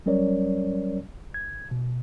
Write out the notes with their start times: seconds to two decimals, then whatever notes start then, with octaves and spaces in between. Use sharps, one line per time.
0.06 F#3 G3 C#4 A#4 C#5 D5
1.34 G#6
1.71 B2